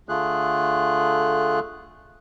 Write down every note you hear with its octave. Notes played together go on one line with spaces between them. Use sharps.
D3 A3 F4 G#4 F#6